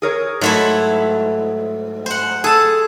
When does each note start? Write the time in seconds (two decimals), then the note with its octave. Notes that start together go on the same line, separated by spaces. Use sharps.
0.02 G#4 A#4 C#5
0.41 G#2 F#3 A3 E4
2.06 C5 F#5
2.44 G#4 A4 A5